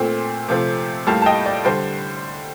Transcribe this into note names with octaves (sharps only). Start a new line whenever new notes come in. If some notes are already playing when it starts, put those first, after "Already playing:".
Already playing: A#2 A3 C4
C3 F3 A3 C4
A2 G3 A#3 F5 A5
A5
D#5 G5
D5
D3 G3 C5